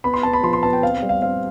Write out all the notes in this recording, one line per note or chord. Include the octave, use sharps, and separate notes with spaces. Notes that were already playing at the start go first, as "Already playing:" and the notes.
B3 B5
C6
B3 A5
B5
F3 C6
C6
B3 A5
G5
C4 F5
G3
F5
C4 F5